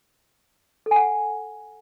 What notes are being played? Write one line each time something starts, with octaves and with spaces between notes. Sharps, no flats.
A4
G#5
F#5